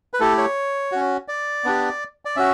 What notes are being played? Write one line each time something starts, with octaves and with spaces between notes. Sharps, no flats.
B4
A3 E4 G4 A4
C#5
C#4 F#4
D5
B3 D4 G4
D5
C#4 F#4 E5